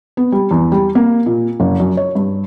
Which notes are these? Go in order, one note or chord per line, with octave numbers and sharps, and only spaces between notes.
B3
G3
E2
G3
A#3
A#2
F#1
F#2
C#5
G2